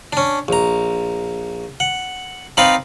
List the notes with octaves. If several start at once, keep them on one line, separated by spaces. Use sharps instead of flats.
C#4 D4
A#1 A#5
F#5
C4 D#4 B4 D5 F5 B5